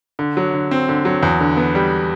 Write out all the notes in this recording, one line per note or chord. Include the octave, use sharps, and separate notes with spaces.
D3
F#3
D3
C4
D3
F#3
E2
D3
B3
G3